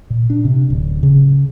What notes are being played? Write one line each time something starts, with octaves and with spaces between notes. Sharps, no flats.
A#2
D4
C3
D1
C#3